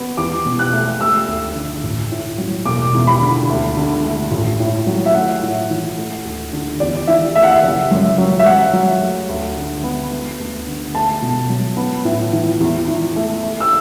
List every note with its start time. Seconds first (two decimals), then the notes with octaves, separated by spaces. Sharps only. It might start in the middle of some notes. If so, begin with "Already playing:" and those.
Already playing: B3
0.17 E2 D6
0.45 B2
0.59 F#6
0.73 A3
1.00 A3 E6
1.28 D2
1.55 D3
1.83 A1
2.11 A2
2.38 F#3
2.66 E1 D6
2.94 E2
3.07 B5
3.22 D3
3.49 D2
3.77 D3
4.04 A3
4.31 A1
4.60 A2
4.87 F#3
5.06 E5
5.14 A3 F#5
5.43 A2
5.70 E3
5.98 A3
6.24 D2
6.52 D3
6.80 E2 D5
7.07 E3 E5
7.36 A3 E5
7.43 F#5
7.51 E5
7.63 F#1
7.91 F#2
8.18 F#3
8.39 E5
8.46 F#2 F#5
8.73 F#3
9.02 A3
9.29 D2
9.56 D3
9.84 B3
10.12 B3
10.40 D2
10.67 D3
10.94 A3 A5
11.22 B2
11.49 F#3
11.77 B3
12.05 A2
12.33 E3
12.60 E2
12.88 E3
13.16 A3
13.43 A3
13.60 E6